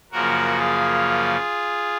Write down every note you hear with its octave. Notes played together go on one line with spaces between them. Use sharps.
F#2 C#3 F3 A#3 F#4 A#4
F4 G#4